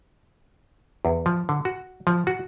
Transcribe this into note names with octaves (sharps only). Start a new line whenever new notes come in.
E2
F3
D3
F#4
F3
F#4